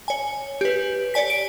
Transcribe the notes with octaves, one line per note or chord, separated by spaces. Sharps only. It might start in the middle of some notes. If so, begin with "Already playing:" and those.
C#5 G#5
G4 B4
C#5 D5 G#5 B6
D7